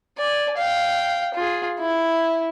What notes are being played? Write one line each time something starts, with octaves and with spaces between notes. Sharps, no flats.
D5 G#5
F5 G5
F4 G#4
E4